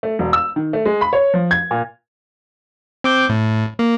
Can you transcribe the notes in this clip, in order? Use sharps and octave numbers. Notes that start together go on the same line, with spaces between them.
A3
E1
E6
D#3
A3
G#3
B5
C#5
F3
G#6
A#2
C4 D6 G6
A2
A#3